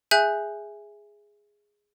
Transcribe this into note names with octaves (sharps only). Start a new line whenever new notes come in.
G#4 E5 G#5 F#6 G6